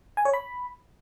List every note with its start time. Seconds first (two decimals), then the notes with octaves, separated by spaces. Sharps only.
0.17 G#5
0.25 C#5
0.34 B5